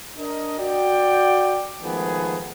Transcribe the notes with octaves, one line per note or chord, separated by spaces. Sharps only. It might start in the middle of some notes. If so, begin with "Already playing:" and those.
D4 A#4 D#5
F#4 D5 G5
D#3 F3 G#3 A3 B3 G#4